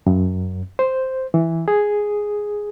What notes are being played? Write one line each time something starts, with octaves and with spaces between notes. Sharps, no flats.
F#2
C5
E3
G#4